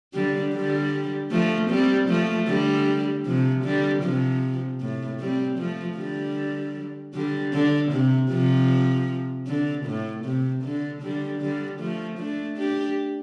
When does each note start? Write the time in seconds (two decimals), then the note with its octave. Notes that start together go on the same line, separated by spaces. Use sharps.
0.14 D3 G3
0.54 D3 G3
1.31 F3 A3
1.70 G3 C4
2.08 F3 A3
2.48 D3 G3
3.25 C3 F3
3.64 D3 G3
4.03 C3 F3
4.80 A2
5.20 G3 C4
5.58 F3 A3
5.97 D3 G3
7.14 D3 G3
7.53 D3
7.92 C3
8.30 C3 F3
9.47 D3
9.86 A2
10.25 C3
10.63 D3
11.02 D3 G3
11.41 D3 G3
11.80 F3 A3
12.19 A3 D4
12.58 D4 G4